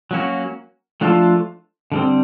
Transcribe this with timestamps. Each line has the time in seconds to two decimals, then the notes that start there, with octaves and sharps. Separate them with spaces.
0.11 F#3 A#3 C#4 F#4
1.01 F3 A3 D4 F4 A4
1.92 D3 G3 C4